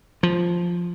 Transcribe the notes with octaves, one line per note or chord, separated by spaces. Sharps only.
F3